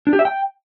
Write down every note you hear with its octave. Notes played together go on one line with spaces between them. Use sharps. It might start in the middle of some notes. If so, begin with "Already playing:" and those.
D4
G4
E5
G5